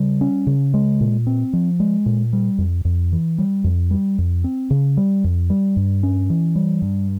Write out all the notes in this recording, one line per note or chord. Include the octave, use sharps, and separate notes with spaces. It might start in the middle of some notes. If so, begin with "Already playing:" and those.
Already playing: C#3 G3
C#4
C#3
G#3
A#2
C4
F3
G#3
A#2
G3
F2
F2
E3
G3
F2
G3
F2
C4
C#3
G3
F2
G3
G2
C#4
E3
G3
G2